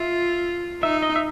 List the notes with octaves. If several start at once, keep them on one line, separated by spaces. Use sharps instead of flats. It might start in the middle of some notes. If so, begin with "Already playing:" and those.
Already playing: F4 E5
D#4 E5
D#5
E5